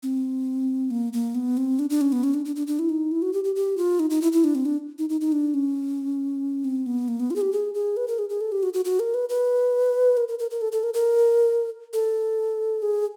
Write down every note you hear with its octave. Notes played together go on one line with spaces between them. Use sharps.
C4
A#3
A#3
B3
C4
D4
D4
C#4
B3
C#4
D4
D4
D4
D4
E4
D#4
E4
F#4
G4
G4
G4
F4
D#4
D#4
E4
E4
D4
C4
D4
D#4
D#4
D#4
D4
C#4
C4
B3
A#3
B3
F4
G#4
G4
G#4
G#4
B4
A#4
G#4
G#4
A4
G4
F#4
F#4
F#4
A#4
B4
B4
A#4
A#4
A#4
A#4
A4
A4
A#4
A#4
A4
G#4